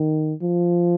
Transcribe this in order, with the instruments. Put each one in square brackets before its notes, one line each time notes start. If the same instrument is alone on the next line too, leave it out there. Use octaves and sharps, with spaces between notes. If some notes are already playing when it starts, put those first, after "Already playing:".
Already playing: [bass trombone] D#3
F3